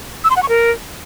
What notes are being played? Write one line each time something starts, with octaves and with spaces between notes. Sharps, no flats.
E6
C6
F#5
C#6
A#4